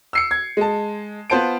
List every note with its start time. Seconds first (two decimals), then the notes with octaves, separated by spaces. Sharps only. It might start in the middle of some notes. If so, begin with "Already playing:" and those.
0.13 E6 C7 C#7
0.31 G#6
0.57 G#3 A5
1.30 B3 F4 C5 A5 D7